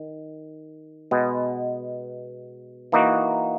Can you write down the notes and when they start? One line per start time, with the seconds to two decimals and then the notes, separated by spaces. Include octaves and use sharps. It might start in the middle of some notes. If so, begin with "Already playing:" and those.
Already playing: D#3
1.11 B2 G#3 B3
2.92 E3 A#3 D#4 F#4